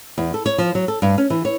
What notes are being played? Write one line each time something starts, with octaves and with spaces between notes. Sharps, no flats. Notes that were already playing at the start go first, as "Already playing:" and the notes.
E2
A4
C#5
F3
F#3
A4
G2
C#4
E3
C#5